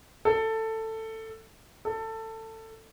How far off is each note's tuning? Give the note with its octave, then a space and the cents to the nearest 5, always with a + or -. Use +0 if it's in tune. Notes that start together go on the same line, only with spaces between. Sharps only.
A4 +15
A4 +20